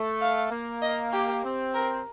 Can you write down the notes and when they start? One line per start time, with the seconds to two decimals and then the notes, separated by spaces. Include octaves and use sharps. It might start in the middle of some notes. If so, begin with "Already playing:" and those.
Already playing: A3
0.21 F5
0.51 A#3
0.82 D#5
1.12 G4
1.44 C4
1.74 A#4